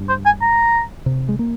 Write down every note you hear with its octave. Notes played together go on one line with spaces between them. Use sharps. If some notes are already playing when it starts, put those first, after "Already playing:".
Already playing: G2
C5
G#5
A#5
C3
G#3
A#3